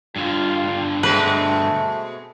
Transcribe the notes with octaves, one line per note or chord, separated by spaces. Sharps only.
G2 D3 F4
B2 G#3 A3 C4 B4